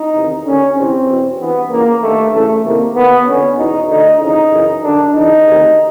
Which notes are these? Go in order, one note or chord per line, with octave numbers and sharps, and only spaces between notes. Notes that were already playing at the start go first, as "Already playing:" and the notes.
Already playing: D#4
E2 C3 D#3
D#2 D3 C#4
E2 C3 E3 C4
E2 B2
G2 E3 B3
C#2 C#3 E3 A#3
G2 D#3 A3
F#2 C#3 E3 A3
C2 C3 D#3 A#3
D#2 D#3 B3
F2 D3 C#4
E2 B2 D#4
D2 D3 D#4
F2 C#3 E3 D#4
F#2 C#3 E3
F#2 D3 D4
E2 C#3 E3 D#4
D2 C3 D#3